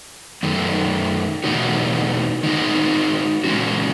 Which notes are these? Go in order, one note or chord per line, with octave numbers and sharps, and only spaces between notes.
F#2 D#3 A3
E2 B2 A3 D#4 F#4
D#3 G#3 D#4 F#4
E3 G#3 C#4 F#4